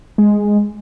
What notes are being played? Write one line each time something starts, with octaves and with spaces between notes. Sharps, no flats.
G#3